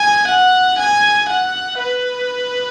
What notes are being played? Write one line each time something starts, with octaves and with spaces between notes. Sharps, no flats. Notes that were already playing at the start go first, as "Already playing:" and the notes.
Already playing: G#5
F#5
G#5
F#5
B4